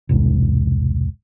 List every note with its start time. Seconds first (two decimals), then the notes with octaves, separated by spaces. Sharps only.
0.09 E1 C2 G#2